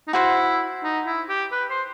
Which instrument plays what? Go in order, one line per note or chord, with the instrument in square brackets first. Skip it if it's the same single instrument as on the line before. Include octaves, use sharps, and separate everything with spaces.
[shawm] D#4
[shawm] E4 [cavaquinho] F#4 C5 F#5 C6
[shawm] D#4
E4
G4
B4
C5